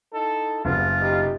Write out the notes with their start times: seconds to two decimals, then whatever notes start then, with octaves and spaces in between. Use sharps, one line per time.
0.13 D#4 E4 A4
0.65 F#1 C2 B3 F4
1.00 B2 D#4 G4